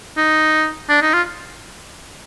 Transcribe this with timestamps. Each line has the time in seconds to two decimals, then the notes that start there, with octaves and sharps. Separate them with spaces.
0.17 D#4
0.89 D4
1.02 D#4
1.14 F4